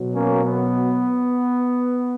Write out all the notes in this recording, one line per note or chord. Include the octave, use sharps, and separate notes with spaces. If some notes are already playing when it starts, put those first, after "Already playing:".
Already playing: B2 F#3
A#3 C#4
B3